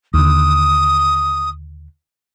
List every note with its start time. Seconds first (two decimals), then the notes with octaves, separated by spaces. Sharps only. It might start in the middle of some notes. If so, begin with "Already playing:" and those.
0.14 D#2 D3 D#6